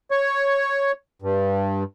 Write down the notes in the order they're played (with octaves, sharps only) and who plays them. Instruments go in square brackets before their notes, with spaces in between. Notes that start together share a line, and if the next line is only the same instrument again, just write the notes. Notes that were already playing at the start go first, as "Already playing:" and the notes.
[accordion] C#5
G2